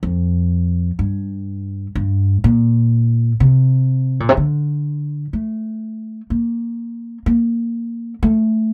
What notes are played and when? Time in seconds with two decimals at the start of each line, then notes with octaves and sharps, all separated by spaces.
0.03 F2
0.99 G2
1.95 G2
2.44 A#2
3.40 C3
4.20 A#2
4.29 C3
4.37 D3
5.33 A3
6.30 A#3
7.26 A#3
8.23 A3